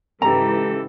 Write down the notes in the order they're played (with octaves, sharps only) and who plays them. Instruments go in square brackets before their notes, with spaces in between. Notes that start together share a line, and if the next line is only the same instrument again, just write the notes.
[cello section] G#2 C#3 E3 [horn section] G4 A4 [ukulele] A#5